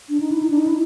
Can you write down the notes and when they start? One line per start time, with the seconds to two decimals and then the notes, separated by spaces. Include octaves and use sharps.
0.09 D4
0.20 D#4
0.32 E4
0.42 D#4
0.50 D4
0.59 D#4
0.67 E4